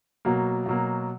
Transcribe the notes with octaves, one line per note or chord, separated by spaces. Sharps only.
B2 F#3 A#3
B2 F#3 A#3